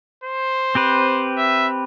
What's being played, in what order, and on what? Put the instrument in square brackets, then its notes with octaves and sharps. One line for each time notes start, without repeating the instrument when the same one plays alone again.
[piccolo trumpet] C5
[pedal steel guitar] C4 G4 B4
[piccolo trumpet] E5